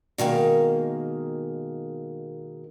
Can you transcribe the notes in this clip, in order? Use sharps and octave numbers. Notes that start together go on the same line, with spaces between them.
B2 D#3 G#3 A#3